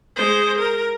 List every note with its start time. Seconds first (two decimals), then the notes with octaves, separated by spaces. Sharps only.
0.16 G#3 C5
0.58 A#4